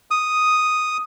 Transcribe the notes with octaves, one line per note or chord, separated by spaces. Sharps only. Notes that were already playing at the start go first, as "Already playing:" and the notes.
D#6